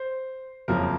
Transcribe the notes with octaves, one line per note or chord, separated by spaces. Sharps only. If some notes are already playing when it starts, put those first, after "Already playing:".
Already playing: C5
F#1 F2 C#3 F3 A#3 A#4